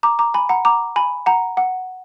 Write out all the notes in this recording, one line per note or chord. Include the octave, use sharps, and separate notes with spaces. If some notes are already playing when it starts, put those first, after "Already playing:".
A#5 D6
A#5 D6
G#5 B5
F#5 A#5
A#5 D6
G#5 B5
F#5 A#5
F#5